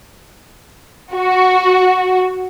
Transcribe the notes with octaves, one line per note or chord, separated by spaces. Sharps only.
F#4